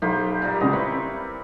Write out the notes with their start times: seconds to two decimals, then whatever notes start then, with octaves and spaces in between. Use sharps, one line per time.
0.02 B1 A#3 G4 C5
0.42 A#2 G3 A#4
0.61 C#2 C#3 D#5
0.73 C4 E4 B4 C#6